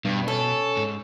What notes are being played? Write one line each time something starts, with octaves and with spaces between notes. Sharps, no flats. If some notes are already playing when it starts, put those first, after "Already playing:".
G2 B2
C#4 A4
G#2